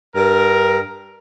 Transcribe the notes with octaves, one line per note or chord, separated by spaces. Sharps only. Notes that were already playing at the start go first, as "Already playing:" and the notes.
G2 A#4